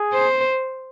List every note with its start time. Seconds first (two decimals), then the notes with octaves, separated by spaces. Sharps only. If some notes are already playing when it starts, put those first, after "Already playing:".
Already playing: G#4
0.14 C5